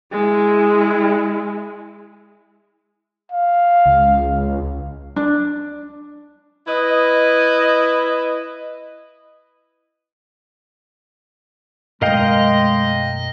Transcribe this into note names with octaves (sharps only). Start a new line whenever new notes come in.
G#3 E4
F5
C#2
D4
E4 B4 D#5
F#2 B2 G#3 A3 A#4 D#5 F5 G5